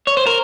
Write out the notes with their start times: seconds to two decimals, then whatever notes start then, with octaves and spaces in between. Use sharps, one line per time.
0.07 C#5
0.17 C5
0.27 A#4